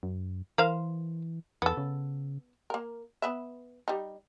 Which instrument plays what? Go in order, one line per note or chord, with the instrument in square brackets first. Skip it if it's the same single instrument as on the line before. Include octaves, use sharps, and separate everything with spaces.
[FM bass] F#2
[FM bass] E3 [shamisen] A#4 C5 F5
[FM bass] E2 [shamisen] B3 A4
[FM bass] C#3
[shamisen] A#3 A#4
B3 B4 E5
G3 D#4